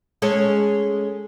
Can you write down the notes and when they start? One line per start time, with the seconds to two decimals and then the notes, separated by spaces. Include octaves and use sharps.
0.22 G#3 C#4 A4